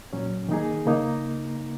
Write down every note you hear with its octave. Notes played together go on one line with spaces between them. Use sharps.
A#2 F#3 C#4
D#3 A#3 D#4 G#4
C#3 A#3 D#4